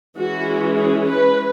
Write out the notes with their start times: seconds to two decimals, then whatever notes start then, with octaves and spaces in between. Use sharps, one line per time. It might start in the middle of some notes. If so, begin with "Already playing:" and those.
0.17 E3 G#3 C#4 F#4
0.77 G#4
1.07 B4